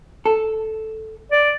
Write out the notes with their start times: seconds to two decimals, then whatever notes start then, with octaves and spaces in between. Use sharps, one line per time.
0.26 A4
1.32 D5